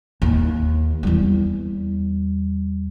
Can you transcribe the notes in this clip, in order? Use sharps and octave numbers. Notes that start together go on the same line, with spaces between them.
D#2
E2 G3